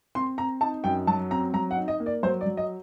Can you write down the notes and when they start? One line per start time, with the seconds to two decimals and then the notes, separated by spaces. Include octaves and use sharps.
0.15 C4 C6
0.38 C4 A#5
0.61 D#4 A5
0.84 F#2 G5
1.07 F#3 A5
1.31 C4 A#5
1.53 F#3 A#5
1.71 F#5
1.77 D#4
1.88 D#5
2.00 A#3
2.06 D5
2.23 F#3 C5
2.41 D5
2.46 F#3
2.57 D#5